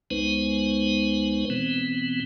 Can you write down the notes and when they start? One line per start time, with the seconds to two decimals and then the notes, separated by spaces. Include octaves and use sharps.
0.11 C#2 G#3 B3 D#4 B4 C5
1.50 B2 E3 B3 C4